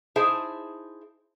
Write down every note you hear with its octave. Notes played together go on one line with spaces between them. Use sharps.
D#4 E4 G#4 C5 E5 A5